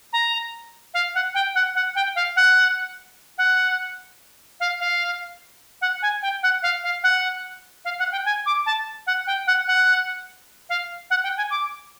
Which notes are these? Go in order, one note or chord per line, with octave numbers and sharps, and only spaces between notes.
A#5
F5
F#5
G5
F#5
F#5
G5
F5
F#5
F#5
F5
F5
F#5
G#5
G5
F#5
F5
F5
F#5
F5
F#5
G5
G#5
D6
A5
F#5
G5
F#5
F#5
F5
F#5
G5
G#5
D6